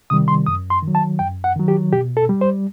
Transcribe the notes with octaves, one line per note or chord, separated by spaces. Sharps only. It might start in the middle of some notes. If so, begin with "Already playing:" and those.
C3 D#3 G3 D#6
C6
F#2 D#6
C6
D#3
F#3
A5
F#2 G5
F#5
D#3 F#3
G4
B2 G4
A4
G3
C5